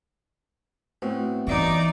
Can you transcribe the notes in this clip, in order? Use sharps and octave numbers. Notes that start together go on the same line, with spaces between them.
A2 B3 C4 F#4
E3 D#4 C#5 D5 E5 C#6 D6